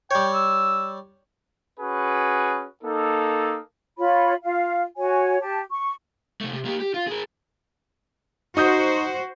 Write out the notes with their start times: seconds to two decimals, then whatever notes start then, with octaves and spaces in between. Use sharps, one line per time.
0.11 G3 C#5 G5
0.34 E6
1.79 C#4 F#4 G#4 B4
2.84 A#3 D#4 A4
3.99 F4 C#5 B5
4.44 F4 F5
4.98 F#4 C#5 G#5
5.41 G4 A5
5.70 C#6
6.41 C3 A3
6.53 C3
6.65 A#3 G4
6.80 G4
6.94 F4
7.07 G#4 A#4
8.57 D#4 F#4 C5 D#6 G6